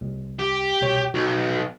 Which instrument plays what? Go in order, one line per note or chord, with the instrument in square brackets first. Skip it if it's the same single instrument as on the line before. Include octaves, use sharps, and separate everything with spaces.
[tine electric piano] C2
[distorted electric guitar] G4
[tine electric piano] C2 B2 C#5
[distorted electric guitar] B1 [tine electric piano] F#4